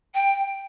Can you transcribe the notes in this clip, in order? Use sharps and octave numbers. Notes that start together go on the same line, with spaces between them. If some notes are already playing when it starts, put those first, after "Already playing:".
G5